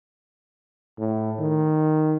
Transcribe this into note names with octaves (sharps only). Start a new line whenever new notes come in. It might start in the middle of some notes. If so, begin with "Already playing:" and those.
A2
D#3